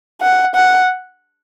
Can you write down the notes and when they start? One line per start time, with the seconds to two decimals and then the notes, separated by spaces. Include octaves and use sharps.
0.21 F#5
0.55 F#5